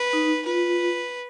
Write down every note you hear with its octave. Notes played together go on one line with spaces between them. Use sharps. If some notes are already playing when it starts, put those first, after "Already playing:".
Already playing: B4
D#4
F4 B4